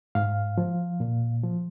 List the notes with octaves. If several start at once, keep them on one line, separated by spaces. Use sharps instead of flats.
G#2 F5
F3
A#2
F3